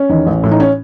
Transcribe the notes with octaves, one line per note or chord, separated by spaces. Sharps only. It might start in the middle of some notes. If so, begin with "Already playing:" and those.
Already playing: C#4
E2 D#3
A1
A2 E3
D#4
C#4